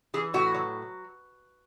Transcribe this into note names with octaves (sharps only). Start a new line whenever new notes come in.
E3 G#4
A2 F#4
F#3